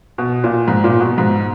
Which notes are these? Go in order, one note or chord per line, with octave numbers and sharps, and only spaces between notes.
B2
A#2
G#2
A#2
B2
G#2